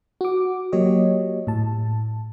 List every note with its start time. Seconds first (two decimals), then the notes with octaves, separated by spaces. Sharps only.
0.21 F#4 D6
0.72 F#3 A#3 G4 C#5 D#5
1.47 A2 A5